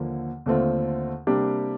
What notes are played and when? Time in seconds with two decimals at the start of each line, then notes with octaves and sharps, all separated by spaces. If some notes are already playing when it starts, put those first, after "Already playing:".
Already playing: D#2 D3 F3 A#3
0.46 D#2 D3 A3 C4 F4
1.27 C3 G3 A#3 D4 G4